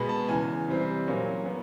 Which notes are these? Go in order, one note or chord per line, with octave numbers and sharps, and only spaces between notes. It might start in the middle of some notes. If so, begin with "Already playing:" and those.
Already playing: B2 G#3 B3 B5
A5
E2 C#3 E3 G#5
C3 E3 G3 C4
A#2 F#3 A#3 C#4
B3